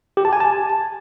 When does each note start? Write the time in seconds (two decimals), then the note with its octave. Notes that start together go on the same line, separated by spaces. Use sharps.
0.17 G4
0.25 A5
0.33 G#5
0.40 A5